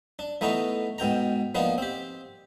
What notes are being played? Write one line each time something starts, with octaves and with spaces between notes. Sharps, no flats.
D4
E3 A3 B3 D#4 A#5
G#2 B2 G5 A#5
F3 A#3 B3 D4 D#4
C4 G4